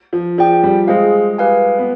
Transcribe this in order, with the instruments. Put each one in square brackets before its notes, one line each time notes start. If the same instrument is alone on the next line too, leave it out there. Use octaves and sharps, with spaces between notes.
[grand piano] F3
[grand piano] F3 [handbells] G#4 D5 G5
[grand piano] G3
[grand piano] G#3 [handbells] G#4 C5 F5
[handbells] G4 B4 F5 G#5
[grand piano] B3